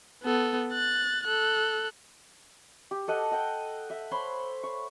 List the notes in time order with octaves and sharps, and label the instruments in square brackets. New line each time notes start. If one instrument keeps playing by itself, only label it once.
[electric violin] B3 A4
F#6 A6
A4 F#6
[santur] G4
A4 D#5 F#5
D#5 F#5 G5
E5 F#5
C5 C#5 B5 C6
C#6